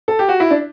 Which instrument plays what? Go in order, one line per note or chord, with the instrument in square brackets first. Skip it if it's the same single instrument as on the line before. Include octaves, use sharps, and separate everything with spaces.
[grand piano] A4
G4
F#4
E4
D4